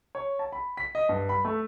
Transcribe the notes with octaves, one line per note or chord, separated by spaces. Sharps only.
C#5
A5
B5
B6
D#5
G2
B5
A3